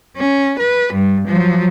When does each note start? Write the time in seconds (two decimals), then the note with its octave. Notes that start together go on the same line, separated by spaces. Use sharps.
0.17 C#4
0.59 B4
0.93 G2
1.28 F3 F#3